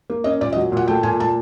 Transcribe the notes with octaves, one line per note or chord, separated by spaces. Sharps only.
A#3
C#4 D#5
A#2 D5
D#5
F#3
A#2 F#5
A3 G5
A#2 G#5
A#2 A5